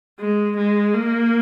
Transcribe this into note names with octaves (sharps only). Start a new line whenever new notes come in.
G#3
G#3
A#3